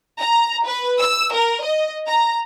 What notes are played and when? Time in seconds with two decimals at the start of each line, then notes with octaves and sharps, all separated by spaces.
0.19 A#5
0.65 B4
0.99 E6
1.34 A#4
1.63 D#5
2.07 A#5